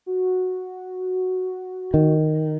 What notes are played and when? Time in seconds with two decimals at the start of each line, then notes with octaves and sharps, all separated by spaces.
0.06 F#4
1.94 D#3